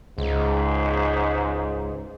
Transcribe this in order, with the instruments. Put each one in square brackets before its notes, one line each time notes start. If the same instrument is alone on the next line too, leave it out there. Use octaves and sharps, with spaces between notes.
[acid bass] C#2 [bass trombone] G#2